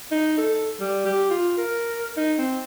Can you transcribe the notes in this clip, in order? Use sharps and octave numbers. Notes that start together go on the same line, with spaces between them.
D#4
A4
G3
G4
F4
A#4
D#4
C4